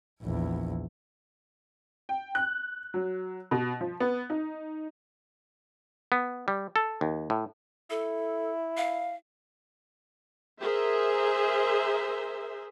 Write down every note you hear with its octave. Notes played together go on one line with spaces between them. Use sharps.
A#1 E2
G5
F#6
F#3
B2
F3
B3
D#4
B3
G3
A4
D#2
A2
E4 A4
F5
G#4 A#4 C5 E5